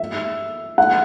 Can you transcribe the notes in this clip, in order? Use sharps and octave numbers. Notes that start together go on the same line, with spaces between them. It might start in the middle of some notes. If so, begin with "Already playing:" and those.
Already playing: E5
F#5